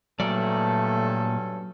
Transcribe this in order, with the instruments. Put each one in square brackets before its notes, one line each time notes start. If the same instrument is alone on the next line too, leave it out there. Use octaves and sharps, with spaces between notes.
[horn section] G2 C#4 A4 [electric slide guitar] A#2 D5 [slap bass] F#3 [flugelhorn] A3